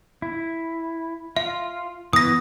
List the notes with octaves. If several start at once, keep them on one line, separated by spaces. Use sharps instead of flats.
E4
F4 E5
E3 B3 E4 D#6 A#6